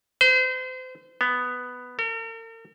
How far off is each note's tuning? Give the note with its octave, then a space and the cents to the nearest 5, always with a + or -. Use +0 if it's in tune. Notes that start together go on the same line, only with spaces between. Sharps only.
C5 -35
B3 +5
A#4 -45